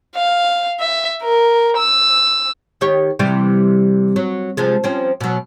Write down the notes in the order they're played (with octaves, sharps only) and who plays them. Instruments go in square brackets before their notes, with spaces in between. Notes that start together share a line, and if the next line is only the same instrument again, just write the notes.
[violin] F5
E5
A#4
E6
[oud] D#3 G4 C#5
C3 E3 G3
F#3
C3 F3 G#3
F3 C4 C#4
B2 F#3